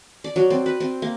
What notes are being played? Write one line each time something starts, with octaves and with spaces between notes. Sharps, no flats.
D5
F#3
C4
B4
C4
A#3